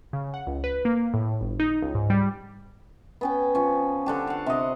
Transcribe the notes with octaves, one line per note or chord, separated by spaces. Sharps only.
C#3
F#5
C#2
B4
A#3
A2
G1
D#4
C#2
G#2
G3
B3 C#4 G5
F3 C#4
D3 D4 G4
F5 F#5
C3 D#5